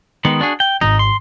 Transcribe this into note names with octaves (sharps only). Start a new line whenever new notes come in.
D#3 G#3 B3
D4 F#4 G#4
G5
G#1 D#4
C6